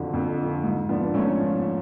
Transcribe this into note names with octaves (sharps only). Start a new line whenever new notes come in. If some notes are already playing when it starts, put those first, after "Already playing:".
Already playing: F2 D3 F3 D4 F#4
F2
D3 F3
G#2
F3 B3 D4
B3
G#2 A3 C#4
F3